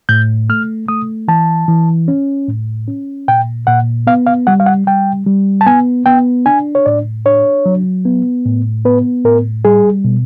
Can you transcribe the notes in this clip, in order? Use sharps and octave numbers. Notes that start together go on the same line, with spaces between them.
A2 G6
A3 F6
A3 D#6
E3 A5
E3
C#4
A2
C#4
A#2 G5
A#2 F#5
B3 F5
F5
G3 F#5
F5
F#5
G3 G5
G3
A5
B3 G#5
B3 G5
D4 G#5
C#5
A2 D5
D4 C#5
F#3
B3
A2
B3 B4
A2 A#4
G3 G#4
B2